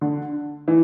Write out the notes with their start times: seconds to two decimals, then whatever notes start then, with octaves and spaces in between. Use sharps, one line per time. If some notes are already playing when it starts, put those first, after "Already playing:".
0.01 D3
0.68 E3